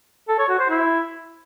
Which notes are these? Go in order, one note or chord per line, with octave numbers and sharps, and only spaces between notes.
A4
C#5
F#4
C5
E4